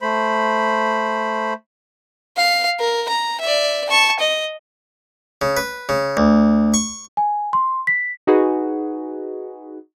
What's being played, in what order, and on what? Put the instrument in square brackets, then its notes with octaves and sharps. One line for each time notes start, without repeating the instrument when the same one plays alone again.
[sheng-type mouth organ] A3 C5 B5
[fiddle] F5
A#4
A#5
D5 E5
A5 C#6
D#5
[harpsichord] C#3
B4
C#3
D2
C#6
[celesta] G#5
C6
B6
[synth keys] D#4 F#4 G#4 B4